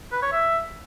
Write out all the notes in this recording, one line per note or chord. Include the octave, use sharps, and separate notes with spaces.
B4
C#5
E5